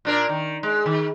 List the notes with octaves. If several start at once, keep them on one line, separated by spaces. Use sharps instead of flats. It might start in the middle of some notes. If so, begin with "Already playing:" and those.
A#2 D4 A#4
D#3
G#3
D#3